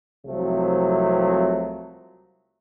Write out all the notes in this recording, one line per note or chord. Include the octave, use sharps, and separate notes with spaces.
C2 C3 F3 F#3 A3